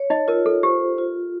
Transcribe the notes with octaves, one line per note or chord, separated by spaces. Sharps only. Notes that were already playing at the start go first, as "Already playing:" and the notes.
Already playing: C#5
D#4 D#5
F4 A#4
A4
G4 C5
F4